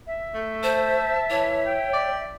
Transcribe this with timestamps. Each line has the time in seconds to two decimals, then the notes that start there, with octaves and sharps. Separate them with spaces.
0.07 E5
0.34 A3
0.63 C5 A5
1.30 E3 C#5
1.67 G5
1.93 D5